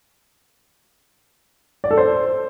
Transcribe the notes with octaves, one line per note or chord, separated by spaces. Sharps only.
D5
A4
C5